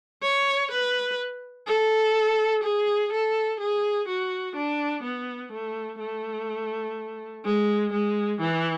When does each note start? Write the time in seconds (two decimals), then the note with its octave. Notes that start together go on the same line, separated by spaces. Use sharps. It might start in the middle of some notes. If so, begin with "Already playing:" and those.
0.23 C#5
0.71 B4
1.67 A4
2.63 G#4
3.12 A4
3.60 G#4
4.08 F#4
4.56 D4
5.03 B3
5.52 A3
6.00 A3
7.45 G#3
7.93 G#3
8.41 E3